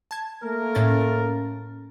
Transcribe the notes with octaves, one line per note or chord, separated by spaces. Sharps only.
A5 G#6
A3 A#3 A#4
A2 C#4 A6